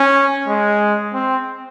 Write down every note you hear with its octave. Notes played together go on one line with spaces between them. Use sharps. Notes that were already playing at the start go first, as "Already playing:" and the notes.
Already playing: C#4
G#3
C4